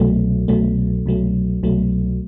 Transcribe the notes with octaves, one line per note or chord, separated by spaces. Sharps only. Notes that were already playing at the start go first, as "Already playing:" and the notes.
Already playing: C2 B2 F#3 A3
C2 B2 F#3 A3
C2 B2 F#3 A3
C2 B2 F#3 A3